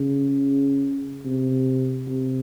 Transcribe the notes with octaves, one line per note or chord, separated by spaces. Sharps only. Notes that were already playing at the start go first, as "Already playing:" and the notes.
Already playing: C#3
C3
C3